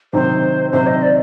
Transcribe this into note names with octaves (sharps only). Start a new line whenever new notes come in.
C3 D#3 F#3 C4 D#4 C5
C3 D#3 F#3 C4 D#4 C5
D#5
D5